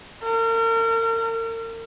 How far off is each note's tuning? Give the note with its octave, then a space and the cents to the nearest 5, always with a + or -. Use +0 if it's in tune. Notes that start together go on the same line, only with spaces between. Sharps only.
A#4 -40